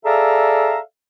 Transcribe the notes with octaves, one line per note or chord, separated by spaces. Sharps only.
G#4 A4 D5 E5 F5 A#5